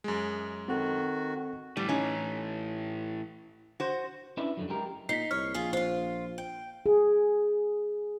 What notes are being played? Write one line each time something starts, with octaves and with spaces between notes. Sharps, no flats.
F#2 G#3
D#3 C4 F#4 A4
A2 E3 G3
C#4 D#4
F#4 C5
C#4 D4 E4 B4 E5
F#2 D3 F#3
F#3 G#3 G4 A#4
A#2 D#4 B6 C7
C2 C#5 F6
A#1 F4 G#4
F4 C5 F5
G5
G#4